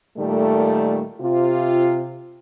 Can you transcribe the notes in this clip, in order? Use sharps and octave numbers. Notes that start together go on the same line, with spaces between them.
A#2 D#3 G3 A3
C3 F4